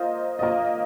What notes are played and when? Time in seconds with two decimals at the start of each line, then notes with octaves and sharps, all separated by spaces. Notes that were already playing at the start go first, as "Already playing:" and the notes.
Already playing: A#3 F4 C5 D#5
0.39 A#3 F4 C5 D#5